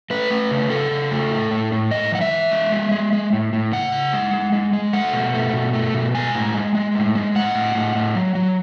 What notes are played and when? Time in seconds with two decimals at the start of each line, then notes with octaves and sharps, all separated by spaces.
0.10 A3 B4
0.30 A3
0.51 C#3
0.70 C#3 A4
0.91 C#3
1.11 A3
1.31 A2
1.51 A2
1.72 A2
1.91 G#3 D#5
2.12 E3 F#5
2.21 E5
2.31 E3
2.51 G#3
2.72 G#3
2.91 G#3
3.13 G#3
3.33 A2
3.53 A2
3.72 C#3 F#5
3.92 C#3
4.13 G#3
4.34 G#3
4.52 G#3
4.73 G#3
4.93 A3 F#5
5.13 B2
5.34 A3
5.53 B2
5.73 A3
5.94 B2
6.14 G#3 G#5
6.35 A2
6.54 G#3
6.75 G#3
6.95 A2
7.15 G#3
7.35 A2 F#5
7.55 A2
7.75 A2
7.95 A2
8.15 F#3
8.35 F#3